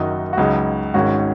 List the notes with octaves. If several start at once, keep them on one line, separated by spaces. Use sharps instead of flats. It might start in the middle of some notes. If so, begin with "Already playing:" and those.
Already playing: F#1 F#2 D#3 F#3 D#4
F#4
C#2 C#3 F#3 D#4
G#1 G#2 D#3 C#4 F#4